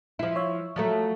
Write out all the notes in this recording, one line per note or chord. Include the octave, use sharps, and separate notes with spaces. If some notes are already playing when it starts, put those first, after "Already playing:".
F3 E4
C#5 E5
F3 F#3 A3